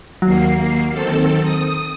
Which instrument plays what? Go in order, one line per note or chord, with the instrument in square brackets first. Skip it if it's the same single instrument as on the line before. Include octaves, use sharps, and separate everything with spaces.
[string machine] D#2 A#3 C7 [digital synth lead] F#3
[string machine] D#3 C4 A4
D#6